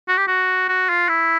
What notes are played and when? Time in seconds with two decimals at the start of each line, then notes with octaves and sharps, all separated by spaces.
0.08 F#4
0.17 G4
0.28 F#4
0.69 F#4
0.89 F4
1.09 E4